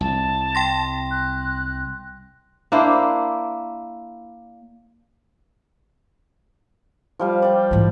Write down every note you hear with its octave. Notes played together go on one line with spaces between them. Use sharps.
C2 A5
G5 C6 A#6
F#6
A#3 D4 E4 C5
F3 G3 F5
D5 G5
G#2 E3